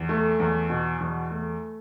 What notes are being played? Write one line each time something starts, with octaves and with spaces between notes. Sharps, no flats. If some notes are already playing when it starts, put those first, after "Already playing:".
Already playing: E2
A3
E2
B2
E2
A3